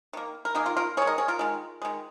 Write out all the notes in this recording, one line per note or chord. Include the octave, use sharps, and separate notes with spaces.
D#3 A#3
A#4
D#3 A#3 D#4 G#4
F4 A#4
F4 A#4
D#3 G#3 G#4 C#5
A#4 D#5
G#4 C#5
F4 A#4
D#3 G#3
D#3 G#3